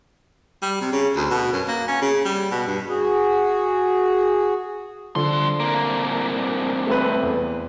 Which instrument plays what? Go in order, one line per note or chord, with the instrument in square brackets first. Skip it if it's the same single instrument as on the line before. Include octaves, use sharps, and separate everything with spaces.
[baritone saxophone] G3
C3
C#3
D2
B2
F#2
A#3
C#4
C#3
G3
B2
G2
[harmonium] F#4 G#4
[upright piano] D3 F3 [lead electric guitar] G3 C6
[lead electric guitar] C2 A#3
[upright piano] A3 C4 B4
E2